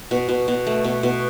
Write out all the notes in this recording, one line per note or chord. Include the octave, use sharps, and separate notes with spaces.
B2
B2
B2
A3
B2
B2